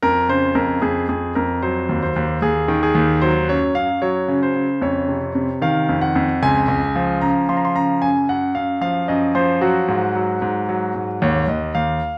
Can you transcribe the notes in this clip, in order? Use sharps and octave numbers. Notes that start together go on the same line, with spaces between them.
F2 A#4
C#3 C5
F2 A#4
F2 G#4
F2 G#4
F2 A#4
F#3 C5
D#2
C5
D#2
D#2 G#4
D#3
G#4
D#2
F#3 C5
F#2 C#5
F#2 F5
F#3 C#5
C#3
C5
C#3
F2 C#5
C3
C3
D#3 F5
F2
F#5
F2
C#2 G#5
C#2
F3
C#3 A#5
F3 C6
A#5
C6
C#3 A#5
F#2 G#5
F#2 F#5
F#2 F5
F3 F5
F#2 D#5
F3 C5
F#3 F#4
G#2
F#3
G#2
F#3
G#2
D#2 C#5
D#2 D#5
D#2 F5